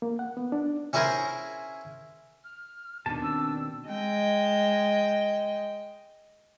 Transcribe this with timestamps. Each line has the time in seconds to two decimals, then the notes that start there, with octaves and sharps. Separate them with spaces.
0.02 A#3
0.19 F#5
0.37 B3
0.52 D4
0.93 C#4 E4 G#4 A#4 C5
2.43 F6
3.06 D#2 B2 D#3 D4 A5
3.22 C4 E6
3.88 G#3 D#5 G5